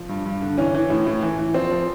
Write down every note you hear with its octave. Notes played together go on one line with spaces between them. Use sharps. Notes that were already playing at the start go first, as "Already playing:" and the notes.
Already playing: F3
G2
G2
D3
E3 C#4
E3
A2
A2
E3
E3
F3 C4
F3